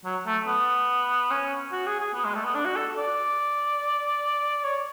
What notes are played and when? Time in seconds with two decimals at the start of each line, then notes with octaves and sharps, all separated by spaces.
0.05 F#3
0.27 A3
0.47 B3
1.31 C#4
1.72 F#4
1.86 G#4
2.00 G#4
2.14 B3
2.24 G#3
2.35 A3
2.45 B3
2.55 D4
2.65 F#4
2.76 A4
2.98 D5
4.65 C#5